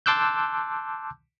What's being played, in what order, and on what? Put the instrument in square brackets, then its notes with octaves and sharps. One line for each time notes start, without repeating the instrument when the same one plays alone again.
[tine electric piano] A5 C6 D6 E6 F#6 G6